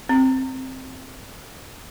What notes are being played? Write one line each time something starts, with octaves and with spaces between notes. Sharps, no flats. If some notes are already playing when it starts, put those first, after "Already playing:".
C4